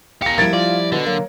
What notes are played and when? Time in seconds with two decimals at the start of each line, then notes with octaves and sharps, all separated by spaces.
0.22 G4 A#4 F5 G#5 A#6 C#7
0.38 F3 G3 A#3 E4 G#6 A6 D7
0.53 F4 D5
0.92 B2 D3
1.06 F#3 A#3